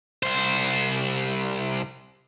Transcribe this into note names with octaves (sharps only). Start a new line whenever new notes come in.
C2 C5